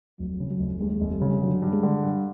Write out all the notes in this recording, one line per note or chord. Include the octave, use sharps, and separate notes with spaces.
F1 F#3
C#3
F#3
F1
D#2 G#3
F1
G3
C#3
D3 F#3
G2
G#3
D3
G2